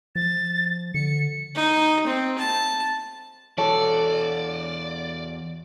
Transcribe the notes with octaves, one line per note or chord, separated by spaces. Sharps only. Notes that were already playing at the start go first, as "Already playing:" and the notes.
F3 A6
D3 C#7
D#4
C4
A5
E2 F#4 A4 C#5 D5